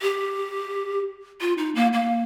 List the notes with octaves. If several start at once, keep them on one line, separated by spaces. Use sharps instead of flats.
G4
F4
D#4
A#3
A#3